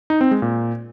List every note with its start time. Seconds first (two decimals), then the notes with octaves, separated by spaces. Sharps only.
0.10 D#4
0.21 C4
0.31 G#3
0.42 A#2